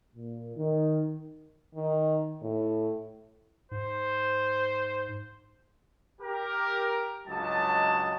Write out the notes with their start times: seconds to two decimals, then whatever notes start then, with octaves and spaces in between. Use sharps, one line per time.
0.15 A#2
0.57 D#3
1.75 D#3
2.42 A2
3.71 G#2 C5
6.21 G4 A#4
7.27 C#2 G2 F#3 D#5 A5